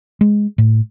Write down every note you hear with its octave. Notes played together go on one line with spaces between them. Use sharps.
G#3
A2